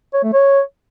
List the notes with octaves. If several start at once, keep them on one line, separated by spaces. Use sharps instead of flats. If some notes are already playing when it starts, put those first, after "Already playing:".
C#5
A3
C#5